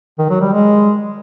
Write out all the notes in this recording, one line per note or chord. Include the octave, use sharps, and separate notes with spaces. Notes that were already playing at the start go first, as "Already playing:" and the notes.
D#3
F#3
G3
G#3